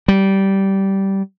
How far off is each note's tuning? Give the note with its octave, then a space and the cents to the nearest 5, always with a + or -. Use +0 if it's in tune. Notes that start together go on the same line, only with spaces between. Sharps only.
G3 -15